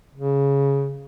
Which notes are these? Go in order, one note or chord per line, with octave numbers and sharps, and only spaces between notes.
C#3